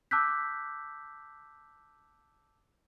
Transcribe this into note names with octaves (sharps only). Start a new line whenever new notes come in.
A5 D6 E6 F#6 G6 B6